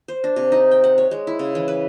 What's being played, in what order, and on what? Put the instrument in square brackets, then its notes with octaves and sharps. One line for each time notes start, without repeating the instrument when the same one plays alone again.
[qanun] C5
D4
C3
D#4
G5
F#5
C#5
G#3
E4
C#3
E3
B4